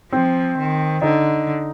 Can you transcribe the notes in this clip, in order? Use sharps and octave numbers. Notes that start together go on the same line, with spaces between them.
F3 C4
D#3
D3 D#4